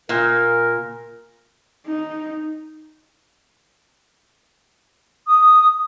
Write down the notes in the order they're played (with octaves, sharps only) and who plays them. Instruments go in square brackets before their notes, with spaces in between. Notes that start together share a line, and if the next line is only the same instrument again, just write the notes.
[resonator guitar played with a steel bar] A#2 [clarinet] A#4
[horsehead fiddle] D#4
[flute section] D#6